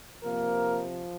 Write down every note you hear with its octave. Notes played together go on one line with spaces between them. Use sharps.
C3 F3 A#3 A#4